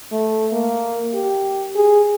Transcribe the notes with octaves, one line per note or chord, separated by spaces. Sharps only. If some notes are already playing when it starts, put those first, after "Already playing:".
A3
A#3
G4
G#4